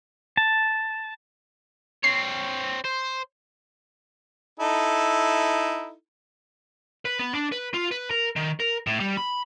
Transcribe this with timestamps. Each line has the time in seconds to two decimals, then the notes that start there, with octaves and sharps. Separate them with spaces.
0.37 A5
2.04 C4 C#5 C7
2.85 C5
4.60 D#4 E4 A4
7.05 B4
7.19 B3
7.35 D4
7.52 B4
7.74 F4
7.91 B4
8.11 A#4
8.36 D#3
8.60 A#4
8.87 A2
9.00 G3
9.17 B5